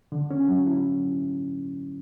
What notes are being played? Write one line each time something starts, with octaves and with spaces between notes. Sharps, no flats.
D3
C#4
F#3
E4